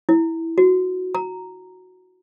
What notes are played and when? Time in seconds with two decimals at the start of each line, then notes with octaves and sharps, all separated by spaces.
0.09 E4
0.58 F#4
1.15 A#5